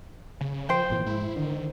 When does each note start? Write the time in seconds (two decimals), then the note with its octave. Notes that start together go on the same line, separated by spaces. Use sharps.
0.41 C#3
0.69 F3 C5 G5
0.90 G#1 A#2 E3
1.06 G#2 E4
1.36 D3 D#3